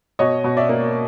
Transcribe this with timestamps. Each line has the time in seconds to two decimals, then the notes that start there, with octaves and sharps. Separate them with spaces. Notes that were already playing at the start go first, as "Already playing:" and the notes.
0.19 B2 C#5 D#5
0.44 B2
0.57 D5 E5
0.69 A#3